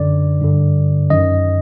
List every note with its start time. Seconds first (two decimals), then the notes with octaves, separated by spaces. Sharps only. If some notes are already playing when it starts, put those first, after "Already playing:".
Already playing: F#2 D3 D5
0.41 G2 D3
1.10 F#2 D#3 D#5